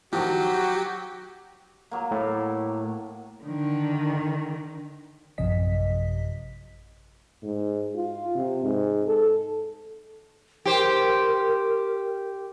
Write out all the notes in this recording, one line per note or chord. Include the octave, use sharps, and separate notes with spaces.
D#3 F3 F#3 F#4 G4
F#3 A#3
A2
D3 D#3
A1 F#2 C3 F3 D#5 B6
G#2
F4
C3
G#2
A4
G4 A#4 C5